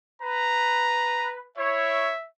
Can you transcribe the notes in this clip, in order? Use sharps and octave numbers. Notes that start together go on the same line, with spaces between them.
B4 A#5
E4 C#5 E5